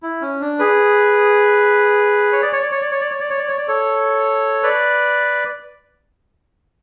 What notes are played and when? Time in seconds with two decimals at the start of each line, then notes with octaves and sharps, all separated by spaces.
0.03 E4
0.22 C#4
0.41 D4
0.59 G#4 B4
2.32 C#5
2.42 D5
2.52 C#5
2.62 D5
2.71 C#5
2.81 D5
2.91 C#5
3.01 D5
3.10 C#5
3.20 D5
3.30 C#5
3.39 D5
3.48 C#5
3.58 D5
3.68 A4 C#5
4.63 B4 D5